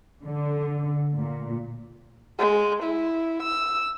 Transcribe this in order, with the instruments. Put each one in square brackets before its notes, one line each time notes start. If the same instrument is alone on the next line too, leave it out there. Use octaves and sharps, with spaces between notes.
[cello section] D3
A#2
[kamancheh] G#3
E4
E6